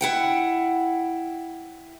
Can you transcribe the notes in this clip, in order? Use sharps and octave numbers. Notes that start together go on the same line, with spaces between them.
E4 F#5 G5